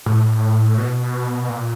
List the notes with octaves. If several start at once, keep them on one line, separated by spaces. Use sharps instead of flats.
A2
B2
A#2